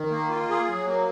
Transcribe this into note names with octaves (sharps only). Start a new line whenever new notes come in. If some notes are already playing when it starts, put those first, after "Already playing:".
Already playing: D#3
A#3
F4
G#4
F#3
A#3